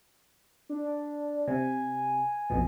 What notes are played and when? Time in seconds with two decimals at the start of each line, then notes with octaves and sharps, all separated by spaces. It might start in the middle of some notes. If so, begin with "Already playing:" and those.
0.69 D4
1.48 C3 G#5
2.50 A#1 F2 B2